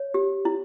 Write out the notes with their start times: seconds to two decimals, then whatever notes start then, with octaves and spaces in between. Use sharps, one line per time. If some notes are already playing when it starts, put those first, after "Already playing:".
Already playing: C#5
0.14 G4
0.45 E4